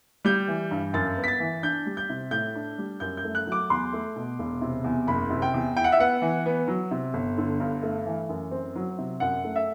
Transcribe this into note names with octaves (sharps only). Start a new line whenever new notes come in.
G3 G6
E3
G2
F#2 A6
B3
B6
A6
E3
D4 G6
G3
G6
C3
A2 G6
D4
G3
F#2 G6
G6
A3
F#6
F#3
D6
E2 C6
A3
B2
E1
C3
E2
F#1 B5
C3
G5
E2
E4 G5
F#5
E5
B3 F#5
E3
B3
F#3
C3
G1
D3
G2
A3
E3
F#2
C4
F#3
C3
F#2 F#5
A3
E5